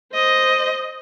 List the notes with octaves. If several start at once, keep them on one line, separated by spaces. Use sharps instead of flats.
C5 D#5